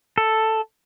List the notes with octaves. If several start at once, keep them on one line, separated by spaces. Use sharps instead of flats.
A4